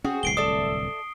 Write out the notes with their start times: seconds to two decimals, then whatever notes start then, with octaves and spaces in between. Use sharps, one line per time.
0.04 C4 C#4 F#4 G#4
0.23 D1 C2 C7 D7 G7
0.37 A4 D5 E5 D#6